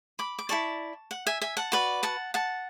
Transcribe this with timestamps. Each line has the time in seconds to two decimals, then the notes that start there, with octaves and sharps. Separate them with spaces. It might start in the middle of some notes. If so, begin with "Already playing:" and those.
0.19 B5 D6
0.39 D6
0.49 E4 A4 D5 A5 C#6
1.11 F#5
1.27 E5 G#5
1.42 E5 G#5
1.57 F#5 A5
1.72 F#4 B4 D5
2.03 F#5 A5
2.34 F#5 A5